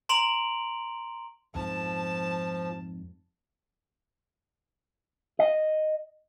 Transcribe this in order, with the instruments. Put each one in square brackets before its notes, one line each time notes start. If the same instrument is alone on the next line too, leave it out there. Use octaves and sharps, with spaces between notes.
[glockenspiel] A#5 C6 D7 F7 F#7
[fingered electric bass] F2 G#2 [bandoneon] F3 [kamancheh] A5
[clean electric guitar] D#5